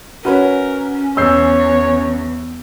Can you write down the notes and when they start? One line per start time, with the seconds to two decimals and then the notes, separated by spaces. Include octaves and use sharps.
0.25 C#4 F#4 A#4 B4 C#5
1.17 E2 C#5 E6 G6 C7